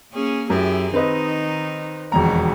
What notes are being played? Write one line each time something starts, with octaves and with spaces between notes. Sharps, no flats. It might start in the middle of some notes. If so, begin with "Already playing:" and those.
A#3 C#4 G#4
F#2 E4 G4 G#4
D#3 C4 D#4 B4 D#5
E1 F2 D#3 F#4 A#5